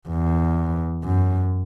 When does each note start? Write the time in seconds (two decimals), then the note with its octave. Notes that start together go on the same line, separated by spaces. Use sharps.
0.09 E2
1.03 F#2